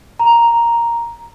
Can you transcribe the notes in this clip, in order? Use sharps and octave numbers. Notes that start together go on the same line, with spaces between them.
A#5